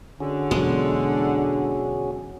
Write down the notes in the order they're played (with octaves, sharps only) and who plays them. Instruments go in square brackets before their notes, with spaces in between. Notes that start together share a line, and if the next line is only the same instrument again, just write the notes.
[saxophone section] D3 [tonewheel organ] C#4 F#4 G#4
[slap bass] E1 F#3 [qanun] G#3